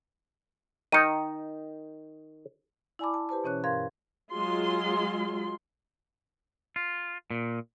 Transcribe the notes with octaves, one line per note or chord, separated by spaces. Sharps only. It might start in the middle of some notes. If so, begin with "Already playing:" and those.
D#3 D#4 D#5 D#6 C#7 D#7
E4 D5 G#5 A5 B5 D6
A5
G4 B4 C5 A5
B2 E3 C#4 C#5 F#6
G2 A#4 F5 C6 G#6
F#3 G#3 F4 C6
F4
A#2